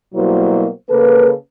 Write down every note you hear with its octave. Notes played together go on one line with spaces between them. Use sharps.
B2 F#3 G3 A#3 E4 C5
C#3 A#3 A4 B4